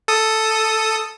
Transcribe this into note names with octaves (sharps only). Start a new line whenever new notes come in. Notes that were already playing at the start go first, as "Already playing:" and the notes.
A4 D#6